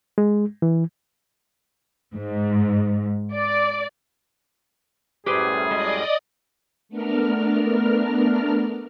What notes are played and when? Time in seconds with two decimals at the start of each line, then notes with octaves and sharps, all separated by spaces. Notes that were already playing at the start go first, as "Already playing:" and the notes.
0.18 G#3
0.62 E3
2.15 G#2
3.33 D5
5.26 F#2 A2 G3 G4 G#4 B4 C5
5.71 G#3 D5 D#5 D#6
6.89 A3 B3 D4 A#4 F6